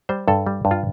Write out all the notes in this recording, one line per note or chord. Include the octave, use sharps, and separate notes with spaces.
G3 C5
G2 A4
G3
G2
F4